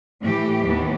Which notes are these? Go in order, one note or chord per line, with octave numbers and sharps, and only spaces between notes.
A2 E3 A3 G4
D#2 E3 B3